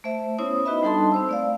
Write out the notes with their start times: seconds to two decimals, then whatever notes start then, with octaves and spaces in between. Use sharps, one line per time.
0.04 A3 C5 E5
0.38 B3 C#4 E4 C5 C#5 D#6
0.66 D#4 F#4 B4 D#5 E5 B5
0.83 G3 D4 D#4 A4 A5 C6
1.12 C4 C5 E6
1.29 A3 D5 F5